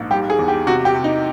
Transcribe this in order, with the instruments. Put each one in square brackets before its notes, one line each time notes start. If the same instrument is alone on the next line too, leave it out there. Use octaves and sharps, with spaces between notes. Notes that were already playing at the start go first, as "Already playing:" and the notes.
Already playing: [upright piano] A#1 G#2
G3 G4
G#4
E2
G4
C3 F#4
G4
C3
D#4